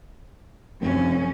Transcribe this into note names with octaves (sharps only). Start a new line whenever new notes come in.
F1 F#2 C#4